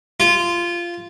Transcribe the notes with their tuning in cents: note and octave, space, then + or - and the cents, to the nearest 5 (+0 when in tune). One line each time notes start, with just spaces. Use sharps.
F4 -15